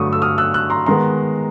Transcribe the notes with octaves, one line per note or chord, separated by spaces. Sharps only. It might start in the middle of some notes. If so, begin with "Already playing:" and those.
Already playing: G2 D3 F#3 A3 C#6 D#6
E6
D#6 F6
E6 F#6
E6 F#6
A#5 C6
D#3 G#3 B3 A#5 C6